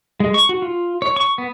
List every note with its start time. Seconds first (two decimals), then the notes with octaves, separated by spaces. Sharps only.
0.20 G#3
0.34 C#6
0.49 F#4
0.62 F4
1.02 C#5
1.16 C#6
1.38 B3